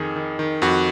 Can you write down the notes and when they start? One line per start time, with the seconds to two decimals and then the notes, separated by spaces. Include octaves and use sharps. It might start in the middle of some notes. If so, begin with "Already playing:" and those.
Already playing: F2 D#3 G#4
0.16 D#3
0.39 D#3
0.62 F2 F#4